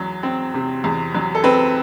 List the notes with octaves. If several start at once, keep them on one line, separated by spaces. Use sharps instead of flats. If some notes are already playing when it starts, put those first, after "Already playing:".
Already playing: E2 F#3
C4
C3
E2
F#3
A4
C4 B4